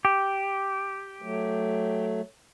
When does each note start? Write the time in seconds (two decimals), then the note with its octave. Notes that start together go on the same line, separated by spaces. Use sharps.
0.05 G4
1.22 F#3 A3